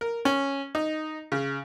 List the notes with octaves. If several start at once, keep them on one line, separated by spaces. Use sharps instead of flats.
A#4
C#4
D#4
C#3